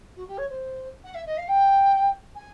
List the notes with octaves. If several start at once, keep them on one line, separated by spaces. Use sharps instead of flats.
F#4
G4
C#5
C5
F#5
E5
D#5
F5
G5
G#5